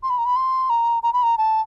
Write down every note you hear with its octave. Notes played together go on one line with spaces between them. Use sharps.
C6
B5
A#5
B5
C6
A#5
A#5
B5
A#5
A5